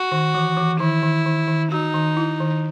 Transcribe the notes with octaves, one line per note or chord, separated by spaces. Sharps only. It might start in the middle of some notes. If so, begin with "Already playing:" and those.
Already playing: F#4
D#3
E3
E3
D#3 E4
D#3
D#3
D#3
D#4 F#4
D#3
E4
D#3